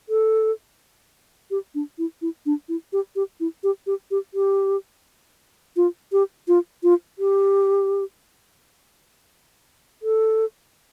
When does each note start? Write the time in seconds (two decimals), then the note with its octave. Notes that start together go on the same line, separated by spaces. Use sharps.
0.09 A4
1.51 G4
1.75 D4
1.98 E4
2.22 E4
2.46 D4
2.69 E4
2.93 G4
3.16 G4
3.40 E4
3.63 G4
3.87 G4
4.11 G4
4.34 G4
5.76 F4
6.12 G4
6.48 F4
6.83 F4
7.19 G4
10.02 A4